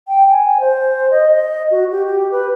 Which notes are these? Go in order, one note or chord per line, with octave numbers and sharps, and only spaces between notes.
G5
G#5
C5
D#5
D#5
F#4
G4
G4
B4